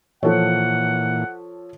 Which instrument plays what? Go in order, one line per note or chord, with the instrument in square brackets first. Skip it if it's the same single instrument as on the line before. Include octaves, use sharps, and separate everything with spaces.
[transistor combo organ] A#2 E3 [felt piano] F3 A4 C#5 [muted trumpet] F#5